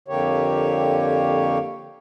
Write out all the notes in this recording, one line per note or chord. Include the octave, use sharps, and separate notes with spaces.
F2 D3 A#3 G4 C#5